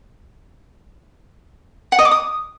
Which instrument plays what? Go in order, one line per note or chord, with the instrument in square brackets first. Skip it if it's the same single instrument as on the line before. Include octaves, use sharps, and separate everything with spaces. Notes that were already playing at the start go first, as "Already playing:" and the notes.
[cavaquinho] F#5
D#5
D6
D#6